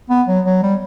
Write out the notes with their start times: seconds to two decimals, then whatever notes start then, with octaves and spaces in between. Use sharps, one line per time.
0.10 B3
0.28 F#3
0.45 F#3
0.63 G3